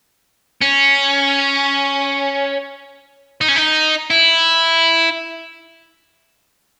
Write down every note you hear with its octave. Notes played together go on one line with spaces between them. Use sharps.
C#4
D#4
C#4
D#4
E4